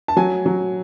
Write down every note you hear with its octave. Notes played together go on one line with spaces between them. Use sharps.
A5
F#3 G#5
F#3